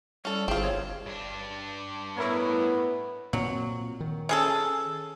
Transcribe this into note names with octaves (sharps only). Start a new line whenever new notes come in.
G3 C#4 A4
G1 C4 F4 G#4
C#5
G2 D4
A2 B3 E4 A#4 C#5
A#2 F#3 C4
D#3
C#4 G#4 A4